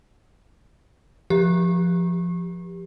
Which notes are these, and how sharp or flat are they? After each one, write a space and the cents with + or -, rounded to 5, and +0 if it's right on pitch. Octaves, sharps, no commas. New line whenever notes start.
F3 +0 G4 +10